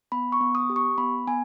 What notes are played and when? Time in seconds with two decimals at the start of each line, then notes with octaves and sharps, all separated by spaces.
0.12 B3 B5
0.32 C#6
0.41 B3
0.55 D#6
0.70 G4
0.76 C#6
0.98 B3 B5
1.27 B3 G#5